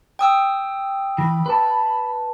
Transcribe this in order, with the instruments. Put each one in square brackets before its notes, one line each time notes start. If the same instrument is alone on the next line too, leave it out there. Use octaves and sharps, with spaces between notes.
[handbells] G5 D#6 E6
[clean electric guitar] E3 [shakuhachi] B5
[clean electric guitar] B4 A5